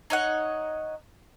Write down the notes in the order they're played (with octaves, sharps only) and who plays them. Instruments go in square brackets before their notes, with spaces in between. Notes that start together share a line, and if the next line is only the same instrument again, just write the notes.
[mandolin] D#4 C#5 D#5 F#5